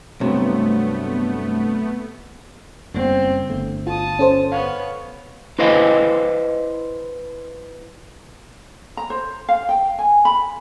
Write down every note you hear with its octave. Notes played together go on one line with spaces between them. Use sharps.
G2 C3 F#3 A3 B3
F#1 G3 B3 C4
G1 A3
F4 A5 D#6
C#4 A4 C5
B3 C#5 F5
E4 B4 C5 D#5 F5
A#5
C5
F5
G5
G#5
B5